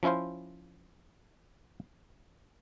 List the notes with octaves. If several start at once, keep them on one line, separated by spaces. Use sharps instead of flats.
F3 C#4 E4 F4 C5